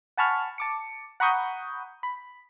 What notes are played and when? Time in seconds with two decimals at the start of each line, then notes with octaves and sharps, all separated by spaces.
0.17 F#5 G#5 A5 B5 C#6 F6
0.58 A5 D6 C#7
1.20 F#5 A#5 B5 C#6 D#6 G6
2.03 B5